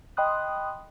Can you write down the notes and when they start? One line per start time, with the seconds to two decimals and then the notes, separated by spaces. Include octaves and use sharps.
0.17 D#5 G5 B5 C6 D#6 F#6